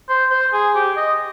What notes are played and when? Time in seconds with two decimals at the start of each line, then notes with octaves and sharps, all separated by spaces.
0.09 C5
0.31 C5
0.53 G#4
0.75 G4
0.97 D#5